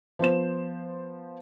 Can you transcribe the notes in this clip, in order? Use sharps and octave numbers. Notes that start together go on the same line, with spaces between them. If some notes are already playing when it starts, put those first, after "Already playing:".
F3 B3 C5 E7